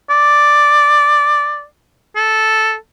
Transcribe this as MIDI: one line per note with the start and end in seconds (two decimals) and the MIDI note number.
0.10 1.65 74
2.16 2.76 69